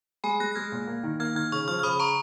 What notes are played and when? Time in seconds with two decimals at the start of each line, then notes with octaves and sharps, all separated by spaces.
0.24 G#3 G#5 B5
0.40 G#3 F#6 A#6
0.52 A#6
0.55 G#3 F6 G#6
0.72 A#2
0.87 A#3
1.03 D#3
1.20 A#3 F6 G#6
1.35 D#3 F6 G#6
1.52 C#3 C#6 F6
1.68 F3 C#6 F6
1.79 F6
1.83 C#3 B5 D#6
2.00 A#5 C#6